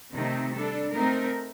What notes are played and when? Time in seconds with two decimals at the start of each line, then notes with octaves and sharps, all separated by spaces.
0.13 C3 D#3 A3 C4 D#4
0.53 G3 D4 A4
0.92 A3 C4 D#4 A#4